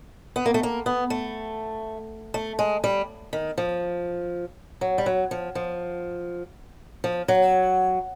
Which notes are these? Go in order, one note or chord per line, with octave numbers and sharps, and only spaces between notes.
B3
A#3
A3
A#3
B3
A3
A3
G#3
G3
D#3
F3
F#3
G3
F#3
F3
F3
F3
F#3